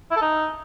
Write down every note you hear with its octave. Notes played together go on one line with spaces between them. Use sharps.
E4
A4
D#4